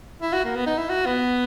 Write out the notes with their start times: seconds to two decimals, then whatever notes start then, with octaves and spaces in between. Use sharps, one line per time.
0.22 E4
0.33 F#4
0.44 A#3
0.56 B3
0.66 D#4
0.78 E4
0.89 F#4
1.06 B3